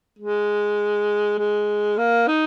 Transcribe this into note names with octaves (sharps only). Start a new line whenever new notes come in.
G#3
G#3
A#3
D#4